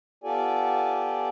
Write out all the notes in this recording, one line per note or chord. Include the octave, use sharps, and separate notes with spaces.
B3 F4 G4 A4 D5 G#5